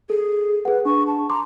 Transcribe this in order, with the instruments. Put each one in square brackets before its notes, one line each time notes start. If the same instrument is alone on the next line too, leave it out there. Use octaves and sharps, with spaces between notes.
[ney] G#4 [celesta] A4
[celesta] G#4 F#5 [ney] B4
[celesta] D4 [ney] C#6
[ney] A5
[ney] A#5 [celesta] C6 D6